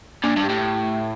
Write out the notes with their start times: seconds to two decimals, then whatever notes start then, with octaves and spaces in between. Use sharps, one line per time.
0.24 A#2 D4
0.37 G2
0.44 G4
0.50 A2